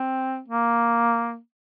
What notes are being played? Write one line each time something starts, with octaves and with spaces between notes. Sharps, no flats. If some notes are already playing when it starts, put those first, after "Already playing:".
Already playing: C4
A#3